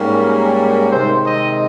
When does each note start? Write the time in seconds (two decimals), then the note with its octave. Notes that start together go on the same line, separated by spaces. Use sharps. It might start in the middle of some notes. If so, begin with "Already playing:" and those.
Already playing: G#2 G3 A#3 C#4
0.22 A#4
0.91 C3 D#3 G#3 C4 C5
1.26 D#5